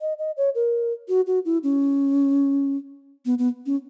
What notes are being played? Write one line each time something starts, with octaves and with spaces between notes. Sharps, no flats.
D#5
D#5
C#5
A#4
F#4
F#4
E4
C#4
B3
B3
C#4